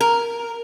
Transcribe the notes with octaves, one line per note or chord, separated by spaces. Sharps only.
A#4